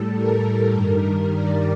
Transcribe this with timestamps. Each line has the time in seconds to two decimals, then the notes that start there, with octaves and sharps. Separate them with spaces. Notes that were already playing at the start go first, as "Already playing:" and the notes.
Already playing: A2 G3 A4
0.16 A#4
0.73 G2 D#3 G3 A#4
1.31 D5